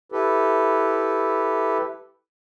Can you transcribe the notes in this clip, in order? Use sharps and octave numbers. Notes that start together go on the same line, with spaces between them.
E4 G4 A4 B4